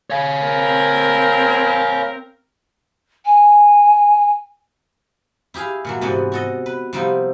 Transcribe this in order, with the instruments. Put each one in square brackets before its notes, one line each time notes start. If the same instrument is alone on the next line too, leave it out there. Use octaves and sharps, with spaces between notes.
[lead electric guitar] C#5 F5
[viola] C4 A#4
[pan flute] G#5
[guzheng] E4 G4 G#4 F5
A#2 E3 F#3
G#2 C3 E3 B3 D4
F#4 A4 D#5
B4
C3 F3 G3 B3 D#4 E4